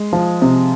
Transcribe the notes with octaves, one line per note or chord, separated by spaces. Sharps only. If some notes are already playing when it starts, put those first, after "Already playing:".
Already playing: G#3
F3
C3